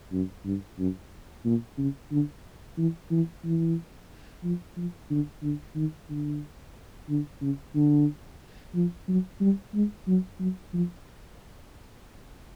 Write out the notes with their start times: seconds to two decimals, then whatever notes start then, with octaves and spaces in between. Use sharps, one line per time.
0.12 F#2
0.45 G2
0.79 F#2
1.45 A#2
1.78 C#3
2.11 D3
2.78 E3
3.11 E3
3.44 E3
4.44 F3
4.76 F3
5.10 D3
5.43 D3
5.76 D#3
6.10 D3
7.09 D3
7.41 C#3
7.75 D3
8.75 F3
9.08 F#3
9.41 G3
9.74 G#3
10.07 F#3
10.40 F#3
10.73 F3